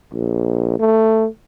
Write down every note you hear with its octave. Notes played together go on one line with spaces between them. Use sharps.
A#1
A3